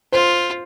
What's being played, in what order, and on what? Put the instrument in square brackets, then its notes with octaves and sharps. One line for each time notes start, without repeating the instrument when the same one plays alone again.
[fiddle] F4 [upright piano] C5